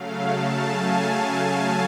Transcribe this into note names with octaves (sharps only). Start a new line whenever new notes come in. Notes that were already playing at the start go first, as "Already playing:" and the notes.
Already playing: C#3 F#3 A3 F5
A5
G#5
A5
A5